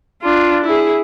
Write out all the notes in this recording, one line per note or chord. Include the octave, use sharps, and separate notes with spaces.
D4 F4
E4 G#4